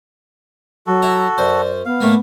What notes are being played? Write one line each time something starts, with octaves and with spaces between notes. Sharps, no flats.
F#3 F#4 A4
E4 A#5
F#2 C5 D5
B3 F5
A2 A3 A#3